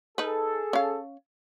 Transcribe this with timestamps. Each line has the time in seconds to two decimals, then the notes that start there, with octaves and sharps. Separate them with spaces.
0.18 D#4 G#4 A4 B4
0.73 C#4 F5